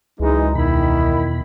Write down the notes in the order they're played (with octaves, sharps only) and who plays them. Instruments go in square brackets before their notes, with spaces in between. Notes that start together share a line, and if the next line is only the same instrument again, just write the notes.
[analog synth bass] C#2 [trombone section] F#2 E3 G#3 [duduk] D#4
[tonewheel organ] E2 B2 B5 [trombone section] D#3 [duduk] E4